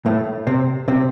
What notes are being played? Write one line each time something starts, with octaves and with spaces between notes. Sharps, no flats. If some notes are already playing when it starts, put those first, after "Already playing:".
A2 A3
C3 C4
C3 C4